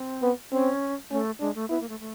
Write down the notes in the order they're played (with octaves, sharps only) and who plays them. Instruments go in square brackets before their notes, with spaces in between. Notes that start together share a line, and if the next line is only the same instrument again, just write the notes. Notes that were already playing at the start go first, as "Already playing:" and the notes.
Already playing: [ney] C4
[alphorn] B3
[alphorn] C4 [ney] C#4
[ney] A3 [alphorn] C#4
[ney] G#3 [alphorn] D4
[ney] A3
[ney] B3 [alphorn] E4
[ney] A#3
A3
A3